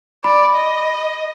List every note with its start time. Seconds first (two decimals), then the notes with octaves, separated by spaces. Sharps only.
0.24 D5 B5
0.55 D#5